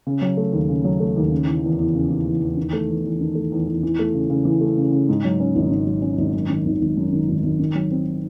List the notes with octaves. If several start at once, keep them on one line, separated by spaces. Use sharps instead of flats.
C#3
F#3
A3
D#2
C#3
F#3
A3
D#2
C#3
E3
E2
E2
C#3
E3
E2
E2
D#3
A3
E2
E2
D#3
A3
E2
E2
E3
A3
C#3
C#3
E3
A3
C#3
C#3
G#2
F#3
C#4
G#1
G#2
F#3
C#4
G#1
F#2
D#3
G#1
G#1
F#2
D#3
G#1
G#1
D#3
F#3
C4